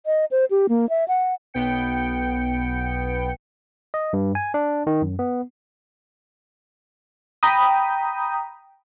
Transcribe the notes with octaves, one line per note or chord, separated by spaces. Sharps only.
D#5
C5
G4
A#3
E5
F#5
B1 B3 G5 C#7
D#5
G2
G#5
D4
D#3
F#2
B3
G5 A#5 B5 D#6